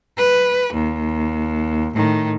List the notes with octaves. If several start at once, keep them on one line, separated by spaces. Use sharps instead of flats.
B4
D#2
A2 D#3